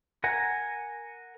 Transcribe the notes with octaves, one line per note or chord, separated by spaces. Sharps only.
A#4 F#5 G#5 A#5